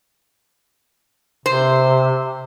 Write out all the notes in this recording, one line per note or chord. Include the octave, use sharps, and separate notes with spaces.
C3 C5